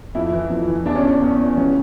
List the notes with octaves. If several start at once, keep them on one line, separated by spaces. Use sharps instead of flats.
F2 E4
E3
F2
E3
E2 D4
C#4
E3 D4
E2
E3
C#2 C#4